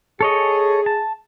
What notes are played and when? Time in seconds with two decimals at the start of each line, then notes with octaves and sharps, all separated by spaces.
0.21 G#4 A4 C#5 D#5
0.86 A5